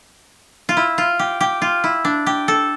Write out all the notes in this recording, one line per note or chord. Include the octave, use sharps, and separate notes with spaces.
F4
E4
F4
G4
G4
F4
E4
D4
G4
A4